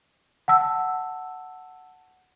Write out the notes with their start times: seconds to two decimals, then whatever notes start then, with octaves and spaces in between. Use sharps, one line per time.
0.48 F#5 A5 E6